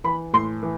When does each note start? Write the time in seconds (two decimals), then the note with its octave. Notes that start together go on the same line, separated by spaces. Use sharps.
0.04 E3 B5
0.33 A2 C6
0.63 E3